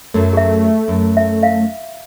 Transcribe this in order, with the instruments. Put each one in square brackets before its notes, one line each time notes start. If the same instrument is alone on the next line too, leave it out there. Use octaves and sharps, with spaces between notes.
[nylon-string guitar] F#2 F#3 [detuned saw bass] A3
[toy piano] G#4 E5
[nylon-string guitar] F#2
[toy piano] E5
E5 F5